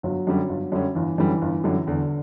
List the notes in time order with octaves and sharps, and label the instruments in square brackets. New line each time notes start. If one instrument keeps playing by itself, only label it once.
[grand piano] G1 [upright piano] F#3
[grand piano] F#2 D3 G3 C#4
G1
F#2 D3 G3 C#4
[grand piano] G1 [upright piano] E3
[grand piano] F#2 D3 G3 C#4 [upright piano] E3
[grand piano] G1
F#2 D3 G3 C#4
[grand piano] E2 [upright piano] D3